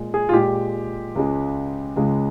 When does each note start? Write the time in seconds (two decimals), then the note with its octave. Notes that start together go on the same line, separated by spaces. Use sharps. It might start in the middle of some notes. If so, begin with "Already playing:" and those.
Already playing: A#2 G#3
0.14 G#4
0.29 F4
0.33 A#2 G#3 G4
1.15 C#2 C#3 G#3
1.96 C#2 C#3 G#3